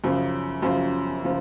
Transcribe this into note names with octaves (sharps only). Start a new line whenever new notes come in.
F#2 C#3 F3
F#2 C#3 F3
C#3 F3